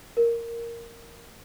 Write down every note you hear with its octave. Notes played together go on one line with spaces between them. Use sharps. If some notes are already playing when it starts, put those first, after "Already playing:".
A#4